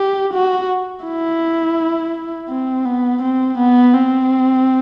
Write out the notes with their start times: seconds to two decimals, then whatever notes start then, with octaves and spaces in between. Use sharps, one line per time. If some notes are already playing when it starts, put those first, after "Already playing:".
Already playing: G4
0.33 F#4
1.05 E4
2.50 C4
2.85 B3
3.22 C4
3.58 B3
3.94 C4